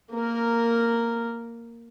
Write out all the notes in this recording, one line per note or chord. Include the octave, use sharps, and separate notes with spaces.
A#3 A#4